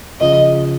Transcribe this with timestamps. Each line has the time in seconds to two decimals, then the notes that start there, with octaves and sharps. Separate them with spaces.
0.20 C#3 F3 D#5